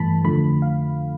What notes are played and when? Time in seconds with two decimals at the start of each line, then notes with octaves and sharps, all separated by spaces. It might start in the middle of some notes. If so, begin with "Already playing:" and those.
Already playing: G2 E3 A3 A5 B5
0.24 F2 D3 F3 A3 B5
0.62 F5